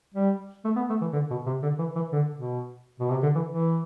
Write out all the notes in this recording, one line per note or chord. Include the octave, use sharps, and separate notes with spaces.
G3
A3
B3
A3
E3
D3
B2
C3
D3
E3
E3
D3
B2
B2
C3
D3
E3
E3